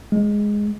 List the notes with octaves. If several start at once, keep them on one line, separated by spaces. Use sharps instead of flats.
G#3